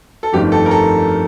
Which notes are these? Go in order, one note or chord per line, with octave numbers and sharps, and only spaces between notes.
A4
G1 F2 D#3 A3 G4
A4
A#4
A4